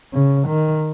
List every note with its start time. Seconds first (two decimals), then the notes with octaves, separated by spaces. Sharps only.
0.13 C#3
0.48 D#3